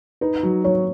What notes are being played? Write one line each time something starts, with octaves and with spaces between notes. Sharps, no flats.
D#4 B4
F#3
F#3 C#5